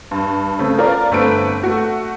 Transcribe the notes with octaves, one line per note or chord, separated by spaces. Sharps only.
G2
C#3 A3 C4
C#4 F4 A#4 D5
G1 A3 C4 B4 D7
A3 F#4